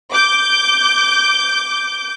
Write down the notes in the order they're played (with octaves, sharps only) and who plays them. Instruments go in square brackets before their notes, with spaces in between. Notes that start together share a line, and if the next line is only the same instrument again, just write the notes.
[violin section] D6 G6